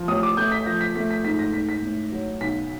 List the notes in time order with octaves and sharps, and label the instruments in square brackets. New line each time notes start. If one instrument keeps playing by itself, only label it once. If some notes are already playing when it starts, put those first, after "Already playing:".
Already playing: [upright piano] F3
A1 D#6
D6
A3 G6
B6
F3 A#6
B6
A3 B6
B6
G#2 B6
A#6
G#2 B6
B6
A2
F#3
B1 B6